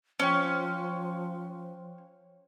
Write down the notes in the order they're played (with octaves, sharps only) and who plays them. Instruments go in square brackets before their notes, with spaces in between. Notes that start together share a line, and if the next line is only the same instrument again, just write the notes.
[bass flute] F3 [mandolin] C#4 [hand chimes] C5 C#5 G5